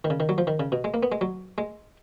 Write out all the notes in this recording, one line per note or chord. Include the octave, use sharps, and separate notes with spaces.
D#3
C#3
D#3
F#3
F3
D#3
C#3
B2
G#3
A#3
B3
G#3
F#3
G#3